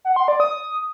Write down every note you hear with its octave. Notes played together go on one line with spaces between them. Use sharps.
F#5
C6
D5
D#6